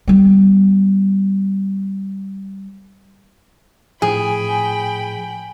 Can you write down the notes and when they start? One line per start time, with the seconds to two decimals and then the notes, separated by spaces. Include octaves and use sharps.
0.07 G3 B3
4.02 A2 F3 G#4 G5 G#5 B5